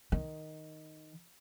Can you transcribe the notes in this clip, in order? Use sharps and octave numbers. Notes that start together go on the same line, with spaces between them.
D#3